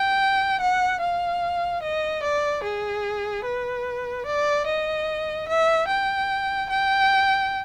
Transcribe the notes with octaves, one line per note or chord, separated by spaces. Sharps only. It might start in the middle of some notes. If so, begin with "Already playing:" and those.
Already playing: G5
F#5
F5
D#5
D5
G#4
B4
D5
D#5
E5
G5
G5